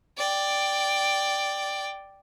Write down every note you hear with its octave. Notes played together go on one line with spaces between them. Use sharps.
D5 G5